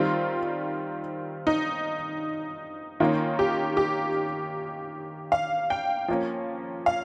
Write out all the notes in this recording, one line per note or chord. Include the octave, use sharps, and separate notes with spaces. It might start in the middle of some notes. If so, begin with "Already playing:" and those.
Already playing: D#3 G3 C4 F4
D#4
D#3 A#3 C#4 F4
G4
G4
F5
G5
F3 A#3 C#4
F5